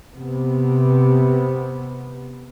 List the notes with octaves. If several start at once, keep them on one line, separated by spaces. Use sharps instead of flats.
C3 B3